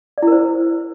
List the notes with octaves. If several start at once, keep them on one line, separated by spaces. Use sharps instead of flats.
E4 A#4 C5 D5